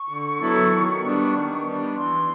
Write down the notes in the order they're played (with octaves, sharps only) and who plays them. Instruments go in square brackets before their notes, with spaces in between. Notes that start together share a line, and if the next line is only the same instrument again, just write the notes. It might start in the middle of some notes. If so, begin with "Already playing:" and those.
Already playing: [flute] C#6
[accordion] D3
F#3 B3 E4 A4
D#3
G3 B3 D4
D#3
G3 B3 D4
[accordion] E3 [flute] C6